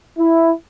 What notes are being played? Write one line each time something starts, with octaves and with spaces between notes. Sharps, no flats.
E4